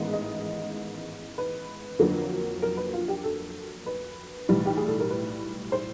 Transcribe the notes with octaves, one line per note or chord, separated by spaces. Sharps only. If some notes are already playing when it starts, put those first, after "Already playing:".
Already playing: A1 G#2 D#3 G#3 B3
D#5
B4
F2 D3 F#3 A#3
A#4
B4
F4
G4
A4
B4
B1 A2 E3 G3
G4
G#4
A4
A#4
B4
C5